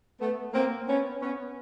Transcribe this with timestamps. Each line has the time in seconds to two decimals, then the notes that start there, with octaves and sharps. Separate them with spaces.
0.21 A3 B3
0.53 A#3 C4
0.88 B3 C#4
1.21 B3 C#4